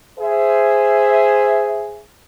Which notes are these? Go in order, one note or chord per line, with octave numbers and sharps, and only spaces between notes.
G#4 C5 E5